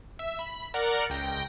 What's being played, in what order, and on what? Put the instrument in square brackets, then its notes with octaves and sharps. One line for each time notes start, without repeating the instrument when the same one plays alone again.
[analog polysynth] E5
B5
A#4 D5 F#5 A#5
C#2 G5 A#6